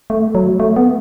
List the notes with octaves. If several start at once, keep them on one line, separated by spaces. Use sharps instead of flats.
A3
F#3
A3
B3